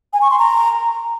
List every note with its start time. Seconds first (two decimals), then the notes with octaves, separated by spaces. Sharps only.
0.13 G#5
0.22 C#6
0.30 C6
0.39 A#5